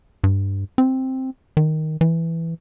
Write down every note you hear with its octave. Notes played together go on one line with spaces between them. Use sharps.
G2
C4
D#3
E3